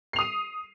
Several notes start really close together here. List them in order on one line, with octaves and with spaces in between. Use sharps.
C7 F7 D#6 D#7